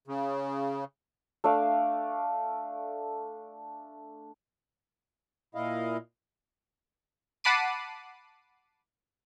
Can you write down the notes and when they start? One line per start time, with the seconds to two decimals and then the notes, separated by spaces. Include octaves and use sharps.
0.08 C#3
1.44 A3 D4 D5 F5
5.55 A#2 E4 D#5 F5
7.44 F#5 A5 B5 D6 C7 D#7